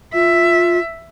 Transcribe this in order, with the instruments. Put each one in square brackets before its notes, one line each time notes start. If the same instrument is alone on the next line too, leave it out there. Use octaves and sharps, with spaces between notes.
[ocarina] F4 [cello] E5